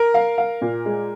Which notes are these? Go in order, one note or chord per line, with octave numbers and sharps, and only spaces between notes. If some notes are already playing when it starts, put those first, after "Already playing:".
Already playing: A#4
F5
F5
A#2
G#3